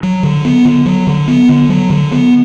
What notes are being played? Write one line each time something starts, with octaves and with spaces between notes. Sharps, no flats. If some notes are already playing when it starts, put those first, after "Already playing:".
F#3
D3
B3
D3
F#3
D3
B3
D3
F#3
D3
B3